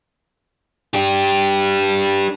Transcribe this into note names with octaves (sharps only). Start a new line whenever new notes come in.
D4 G4